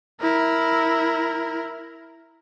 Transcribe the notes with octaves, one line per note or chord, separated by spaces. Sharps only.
E4 A#4